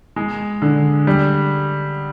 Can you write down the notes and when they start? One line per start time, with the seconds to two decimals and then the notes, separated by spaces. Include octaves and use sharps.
0.16 G#3
0.62 D3
1.07 G3